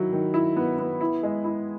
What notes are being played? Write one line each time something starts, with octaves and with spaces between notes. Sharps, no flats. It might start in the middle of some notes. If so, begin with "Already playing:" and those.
Already playing: D#3 F#3 E4
D#3
E4
B3
B3
E4
G#3
E4